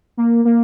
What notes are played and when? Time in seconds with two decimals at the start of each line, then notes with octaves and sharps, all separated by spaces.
0.17 A#3
0.45 A#3